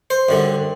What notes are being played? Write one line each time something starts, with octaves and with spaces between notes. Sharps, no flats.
C5
F#2 D3 G3